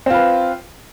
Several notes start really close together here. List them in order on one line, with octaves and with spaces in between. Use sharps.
C4 F4 B4